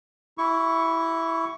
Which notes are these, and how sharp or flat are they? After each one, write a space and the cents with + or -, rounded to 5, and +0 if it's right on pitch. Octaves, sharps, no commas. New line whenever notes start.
E4 +0 G4 -45 C#6 +5